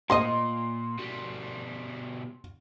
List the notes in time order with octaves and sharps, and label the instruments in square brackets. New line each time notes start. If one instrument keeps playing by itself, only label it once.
[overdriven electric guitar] A#2 [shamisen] A#3 C5 D#5 [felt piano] C6
[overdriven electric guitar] B2 G3